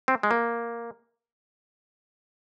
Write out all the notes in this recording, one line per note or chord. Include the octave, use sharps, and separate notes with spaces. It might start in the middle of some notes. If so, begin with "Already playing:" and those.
C4
G#3
A#3